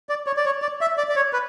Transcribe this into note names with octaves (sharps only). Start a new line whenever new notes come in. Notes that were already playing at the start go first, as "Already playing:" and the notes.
D5
C#5
D5
C#5
D5
E5
D5
D5
C#5
B4